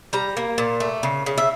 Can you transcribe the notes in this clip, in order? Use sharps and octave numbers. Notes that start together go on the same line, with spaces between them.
G3 A#5
A#3
A#2
A3
C#3
C#3
E5